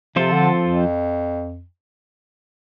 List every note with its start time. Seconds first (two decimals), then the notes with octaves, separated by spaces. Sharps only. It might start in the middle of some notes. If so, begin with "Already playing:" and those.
0.16 C3 F3 C4 F4 A4 C5
0.32 D3
0.65 F2